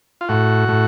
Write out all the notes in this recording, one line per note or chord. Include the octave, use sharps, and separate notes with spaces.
F4
A2 F#4
A2